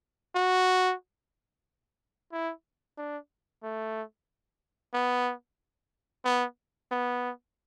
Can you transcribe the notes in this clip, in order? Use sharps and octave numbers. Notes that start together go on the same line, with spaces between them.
F#4
E4
D4
A3
B3
B3
B3